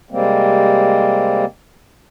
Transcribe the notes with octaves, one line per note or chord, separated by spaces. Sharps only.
C3 G3 G#3 A#3 C4